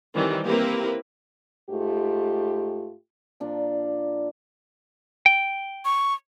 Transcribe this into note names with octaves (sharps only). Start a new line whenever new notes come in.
D#3 E3 G3 C4
A#3 C4 E4 G4 A#4 B4
G#2 A3 F4 G4
A#2 F3 A#3 D4
G5
C#6